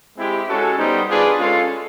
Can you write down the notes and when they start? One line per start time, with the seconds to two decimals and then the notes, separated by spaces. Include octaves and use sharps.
0.17 G#3 C4 E4 G4
0.48 G#3 C#4 F#4 A4
0.78 G3 B3 D#4 G4 C5
1.10 D4 F4 G#4 B4 D5
1.39 G#3 C#4 F4 A4